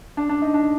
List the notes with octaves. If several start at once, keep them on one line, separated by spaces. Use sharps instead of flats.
D4
D4
D#4
D4